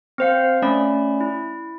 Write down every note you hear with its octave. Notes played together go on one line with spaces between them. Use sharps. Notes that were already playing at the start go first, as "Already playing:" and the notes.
C4 C5 F5
A3 C#4 D5 B5
E4